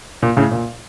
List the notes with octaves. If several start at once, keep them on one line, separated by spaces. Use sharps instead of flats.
A#2
A2 C#3
A#2